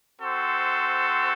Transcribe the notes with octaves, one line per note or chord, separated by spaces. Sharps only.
C4 F#4 A4 C5